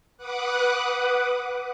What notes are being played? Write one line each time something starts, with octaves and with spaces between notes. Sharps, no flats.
B4 F#5 D6 D#6 F#6